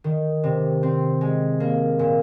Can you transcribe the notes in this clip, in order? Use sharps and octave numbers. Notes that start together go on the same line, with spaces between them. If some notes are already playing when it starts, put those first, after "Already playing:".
D#3
C3
C4
G#3
A#3
A#2